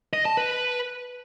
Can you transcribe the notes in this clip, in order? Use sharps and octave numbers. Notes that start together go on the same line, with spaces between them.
D#5
A5
B4